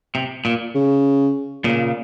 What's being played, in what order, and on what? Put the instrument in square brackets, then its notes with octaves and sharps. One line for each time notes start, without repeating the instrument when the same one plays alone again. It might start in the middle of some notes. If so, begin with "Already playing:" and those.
[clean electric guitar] C3
A#2
[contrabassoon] C#3
[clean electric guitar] A#2 C#3